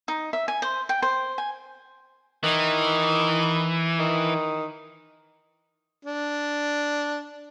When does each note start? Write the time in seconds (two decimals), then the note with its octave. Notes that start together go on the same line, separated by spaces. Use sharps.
0.08 D#4
0.33 E5
0.48 G#5
0.62 C5
0.89 G5
1.02 C5
1.38 G#5
2.43 D#3 E3
3.99 D#3
6.05 D4